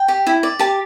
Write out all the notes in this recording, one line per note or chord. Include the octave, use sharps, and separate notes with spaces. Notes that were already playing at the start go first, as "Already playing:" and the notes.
Already playing: G5
G4
E4
D5
G4 A5